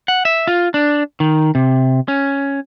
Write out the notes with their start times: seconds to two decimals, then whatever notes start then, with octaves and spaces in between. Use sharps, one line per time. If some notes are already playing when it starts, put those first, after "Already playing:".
0.08 F#5
0.25 E5
0.47 F4
0.74 D4
1.20 D#3
1.55 C3
2.08 C#4